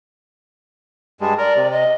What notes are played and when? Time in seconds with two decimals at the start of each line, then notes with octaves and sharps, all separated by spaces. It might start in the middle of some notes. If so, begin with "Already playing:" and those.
1.21 G2 G3 G#3 A5
1.38 A#4 D5
1.56 C3
1.72 D#5